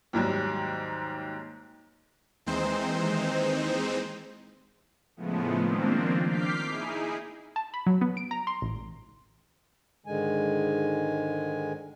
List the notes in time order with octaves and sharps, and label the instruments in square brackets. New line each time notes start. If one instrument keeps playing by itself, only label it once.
[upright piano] D#2 G#2 F#3 G3
[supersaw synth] D#2 E3 G#3 C4 D#4 C5
A2 C#3 F3 G#3 A3 B3
D#3 F3 A#3 C4 D4
D6 F6 G6 B6 C7
D#4 E4 G#4
[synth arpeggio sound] A5
B5
F#3
B3
D7
A#5
C6
A1
[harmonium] G#2 D3 D#3 G#3 G#5